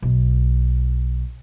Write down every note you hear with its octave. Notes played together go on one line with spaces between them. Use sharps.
B1